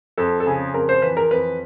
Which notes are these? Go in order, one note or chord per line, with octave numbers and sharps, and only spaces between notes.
F2 A4
A4
C#3 G#4
F2 A#4
C5
E3 B4
A#4
F2 B4